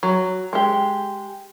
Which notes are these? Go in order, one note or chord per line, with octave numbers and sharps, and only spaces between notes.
F#3
G#3 G4